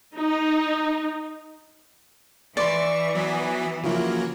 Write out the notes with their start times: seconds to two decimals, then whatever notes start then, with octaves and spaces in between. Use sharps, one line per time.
0.16 D#4
2.57 E3 D5 C6 C#6
3.15 F#3 B3
3.84 C#3 F3 F#3 A#3 E4